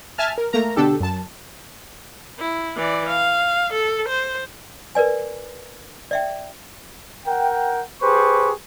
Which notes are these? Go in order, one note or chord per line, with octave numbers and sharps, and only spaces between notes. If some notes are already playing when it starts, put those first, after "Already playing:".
E5 G#5 A5 F6
A#4
A3 A#3 A#4 A#5
B2 D3 D4 G4 A4
F#2 A5
E4
E3 D5
F5
A4
C5
A#4 B4 D5 G#5
D5 E5 G5
A#4 F#5 G5
G4 G#4 B4 C5 C#6